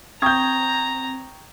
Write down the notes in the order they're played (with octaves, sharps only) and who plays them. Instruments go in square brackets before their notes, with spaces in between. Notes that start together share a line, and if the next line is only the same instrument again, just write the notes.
[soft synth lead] C4 [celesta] G5 C#6 D#6 [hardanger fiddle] A#5 [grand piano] G6 G#6